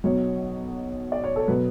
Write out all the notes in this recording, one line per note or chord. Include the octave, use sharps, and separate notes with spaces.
B1 B2 F#3 C#5
D5
C#5
A4
B2 F#3 B4